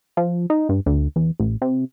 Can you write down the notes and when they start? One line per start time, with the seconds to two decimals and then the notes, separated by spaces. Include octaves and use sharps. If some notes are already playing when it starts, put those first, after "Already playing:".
0.17 F3
0.50 D#4
0.69 G2
0.86 D2
1.16 E2
1.40 A1
1.62 C3